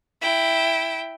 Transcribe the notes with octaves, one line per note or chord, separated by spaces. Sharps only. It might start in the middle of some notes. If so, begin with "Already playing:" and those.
E4 G5